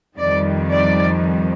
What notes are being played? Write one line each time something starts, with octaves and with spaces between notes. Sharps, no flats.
F2 D#3 G3 D5
D5